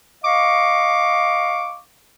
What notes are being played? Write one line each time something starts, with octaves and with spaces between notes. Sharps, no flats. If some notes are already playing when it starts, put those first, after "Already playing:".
D#5 F5 C#6 D6